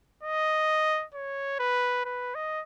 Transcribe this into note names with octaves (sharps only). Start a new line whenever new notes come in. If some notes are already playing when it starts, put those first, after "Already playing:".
D#5
C#5
B4
B4
D#5